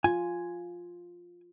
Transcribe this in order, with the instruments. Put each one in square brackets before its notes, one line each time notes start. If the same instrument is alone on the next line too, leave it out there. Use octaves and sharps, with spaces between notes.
[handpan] F4 [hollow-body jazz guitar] G#5